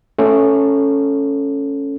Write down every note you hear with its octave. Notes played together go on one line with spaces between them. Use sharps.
A3 C#4 A4